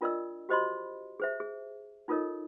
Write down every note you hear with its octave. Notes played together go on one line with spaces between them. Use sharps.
D4 F4 A#4 D5 D#5 E6
F#4 G4 C5 D#5 B5 C6
G#4 C5 E5
G#4
D#4 F4 A4 A#4 C#5 D#5